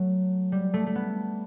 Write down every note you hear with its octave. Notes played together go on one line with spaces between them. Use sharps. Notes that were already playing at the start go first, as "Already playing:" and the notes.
Already playing: F#3 A3
G3
A3
A3
B3